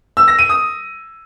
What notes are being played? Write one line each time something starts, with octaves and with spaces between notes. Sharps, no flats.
E6
A#6
D#7
D#6